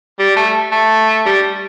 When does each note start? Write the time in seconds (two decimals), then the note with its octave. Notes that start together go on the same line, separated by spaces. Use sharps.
0.19 G3
0.36 A3
0.72 A3
1.26 G3